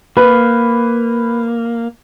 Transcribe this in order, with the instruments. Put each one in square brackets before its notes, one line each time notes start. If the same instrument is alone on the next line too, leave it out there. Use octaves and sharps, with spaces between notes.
[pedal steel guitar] A#3 [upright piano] B4